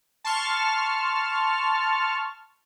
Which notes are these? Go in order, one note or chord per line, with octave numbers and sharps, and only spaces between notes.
A5 C6 C#6 F6